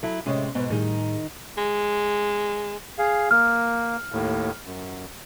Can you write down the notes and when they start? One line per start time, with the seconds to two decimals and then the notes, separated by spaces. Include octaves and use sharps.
0.03 F#3 E4 A4
0.26 A2 C3 G#3 C#4 C#5 D#5
0.55 G#2 B2 B3 B4
0.70 A2 D#3 G3 D#4 G#4
1.57 G#3
2.98 G#4 F5
3.31 A#3 F6
4.12 D#2 A2
4.66 F#2